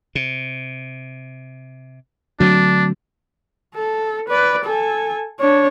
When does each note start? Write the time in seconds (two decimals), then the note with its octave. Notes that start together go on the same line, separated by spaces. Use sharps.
0.15 C3
2.40 D3 F#3 A3 C4 D4
3.75 A4
4.28 B4 D5
4.65 A4 G#5
5.40 D4 C#5